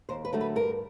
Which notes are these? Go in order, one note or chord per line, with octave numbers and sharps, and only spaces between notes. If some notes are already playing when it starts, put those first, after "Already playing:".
D#2 C5
B4
D3 F#3 A3
B4
G2 A#4